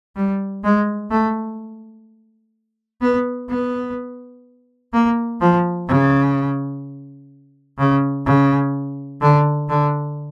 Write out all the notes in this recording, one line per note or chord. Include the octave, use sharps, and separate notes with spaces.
G3
G#3
A3
B3
B3
A#3
F3
C#3
C#3
C#3
D3
D3